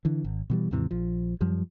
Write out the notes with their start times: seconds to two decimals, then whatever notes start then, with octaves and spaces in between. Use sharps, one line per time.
0.05 D3 E3
0.24 G#1
0.50 B2 E3 G3
0.71 D#2 G#2 C3 E3
0.91 A#1 F3
1.41 F#2 F3 G3